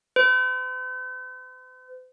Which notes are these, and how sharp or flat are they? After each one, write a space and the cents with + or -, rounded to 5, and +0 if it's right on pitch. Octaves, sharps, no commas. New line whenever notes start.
C5 -45